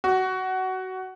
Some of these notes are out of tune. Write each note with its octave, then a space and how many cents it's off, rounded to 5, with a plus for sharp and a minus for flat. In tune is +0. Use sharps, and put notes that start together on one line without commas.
F#4 +20